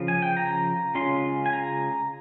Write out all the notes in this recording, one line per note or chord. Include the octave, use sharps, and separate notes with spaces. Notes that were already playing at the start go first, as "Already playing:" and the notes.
Already playing: C#3 F3
G#5
G5
A#5
C#3 G#3 C#4 F4 C6
G#5
A#5